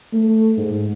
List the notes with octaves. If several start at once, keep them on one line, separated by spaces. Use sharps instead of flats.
A3
G#2